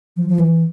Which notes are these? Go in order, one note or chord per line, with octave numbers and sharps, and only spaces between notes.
F3
F3
E3